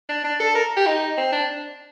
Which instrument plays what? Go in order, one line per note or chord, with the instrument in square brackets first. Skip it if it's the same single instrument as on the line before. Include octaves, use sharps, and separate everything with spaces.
[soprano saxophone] D4
D4
A4
A#4
G4
D#4
C4
D4